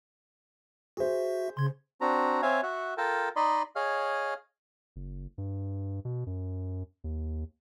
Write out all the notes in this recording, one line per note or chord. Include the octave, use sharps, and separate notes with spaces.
F#4 G#4 C5 E5
C#3 C6 G#6
C4 D4 F#4 A#5
C4 C#5 E5 F5 G#5
F#4 E5 F#5
F4 A4 A#4 G5 A5
D#4 D5 D#5 B5 C6
G#4 C#5 D#5 F5 F6
F#1
G2
B2
F#2
D#2